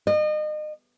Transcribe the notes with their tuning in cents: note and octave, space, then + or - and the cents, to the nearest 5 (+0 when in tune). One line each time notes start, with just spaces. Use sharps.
D#5 -35